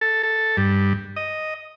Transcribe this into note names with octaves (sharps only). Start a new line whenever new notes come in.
A4
A4
G2
D#5